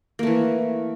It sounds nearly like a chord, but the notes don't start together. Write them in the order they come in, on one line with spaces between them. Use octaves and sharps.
A#3 A3 E3